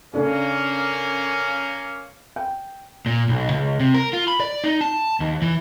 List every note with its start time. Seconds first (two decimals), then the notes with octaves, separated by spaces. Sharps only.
0.14 C#3 A#3 C#4 D4 A4
2.36 G5
3.06 A#2
3.29 B1
3.50 C#2
3.80 C3
3.94 A#4
4.13 F4
4.28 B5
4.40 D5
4.64 D#4
4.81 A5
5.20 D#2
5.42 E3